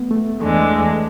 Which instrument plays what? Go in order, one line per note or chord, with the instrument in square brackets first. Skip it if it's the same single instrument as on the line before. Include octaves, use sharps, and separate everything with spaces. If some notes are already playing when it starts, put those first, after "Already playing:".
Already playing: [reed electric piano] A3 B3
A3
[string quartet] E2 D3 G#3 [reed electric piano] A3